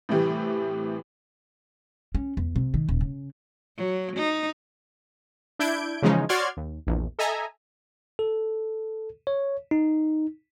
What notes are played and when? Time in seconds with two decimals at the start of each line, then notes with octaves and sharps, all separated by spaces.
0.09 A2 C3 E3 G3
2.15 C#4
2.37 E2
2.56 C3
2.74 D#3
2.89 D#1
3.01 C#3
3.77 F#3
4.16 D#4
5.59 D4 E4 G6 G#6 D7
6.02 C#3 E3 F3 G#3 C#4 D#4
6.29 F#4 C#5 D5 C6 F6 G#6
6.57 D#2
6.87 A#1 E2
7.19 A4 D#5 E5 G#5 A#5
8.19 A4
9.27 C#5
9.71 D#4